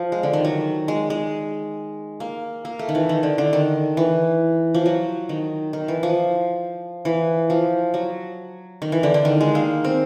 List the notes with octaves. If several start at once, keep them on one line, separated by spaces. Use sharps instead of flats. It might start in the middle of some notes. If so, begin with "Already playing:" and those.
Already playing: F3
G#3
D3
D#3
F#3
G#3
G#3
A#3
A#3
A3
D#3
E3
D#3
D3
D3
D#3
E3
F3
F#3
D#3
D#3
E3
F3
E3
F3
F#3
D#3
E3
D3
D3
D#3
G#3
A#3
C4